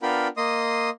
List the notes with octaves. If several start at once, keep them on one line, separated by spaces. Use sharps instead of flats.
B3 D4 F4 A#4 G5 B5
A#3 D#5 C6 D#6